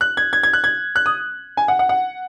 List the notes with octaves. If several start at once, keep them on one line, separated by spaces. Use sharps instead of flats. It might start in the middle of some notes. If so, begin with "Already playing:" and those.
F#6
G#6
G#6
G#6
F#6
G#6
F#6
D#6
G#5
F#5
F#5
F#5